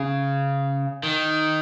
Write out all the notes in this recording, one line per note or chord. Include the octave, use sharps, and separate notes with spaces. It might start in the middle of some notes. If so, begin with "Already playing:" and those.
Already playing: C#3
D#3